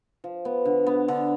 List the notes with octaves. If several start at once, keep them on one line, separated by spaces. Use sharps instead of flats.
F3
B3
D3
B3
D3